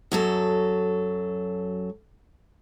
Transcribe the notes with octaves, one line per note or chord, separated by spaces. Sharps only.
F#2 F#3 A4